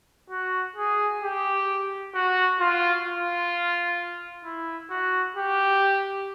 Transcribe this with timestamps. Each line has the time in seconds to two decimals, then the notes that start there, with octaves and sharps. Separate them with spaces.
0.30 F#4
0.76 G#4
1.22 G4
2.15 F#4
2.60 F4
3.06 F4
4.44 E4
4.90 F#4
5.36 G4